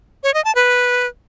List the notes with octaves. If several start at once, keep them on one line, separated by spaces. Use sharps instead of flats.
C#5
D#5
A5
B4